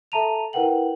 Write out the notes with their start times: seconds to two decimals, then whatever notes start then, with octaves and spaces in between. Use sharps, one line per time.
0.12 A4 E5 A5 A#5 D#7 F7
0.53 E4 A#4 B4 F#5 G5 F#7